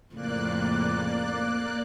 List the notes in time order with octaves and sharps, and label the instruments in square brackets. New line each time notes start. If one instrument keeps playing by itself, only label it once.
[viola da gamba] F2 A2 C#3 [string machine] A#3 D5 F#6